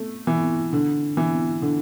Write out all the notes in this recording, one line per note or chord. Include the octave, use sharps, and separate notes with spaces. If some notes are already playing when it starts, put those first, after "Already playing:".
Already playing: A3
E3
D3
E3
D3